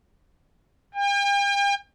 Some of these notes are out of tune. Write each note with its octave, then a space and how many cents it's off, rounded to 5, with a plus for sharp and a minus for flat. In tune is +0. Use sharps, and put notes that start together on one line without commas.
G5 +40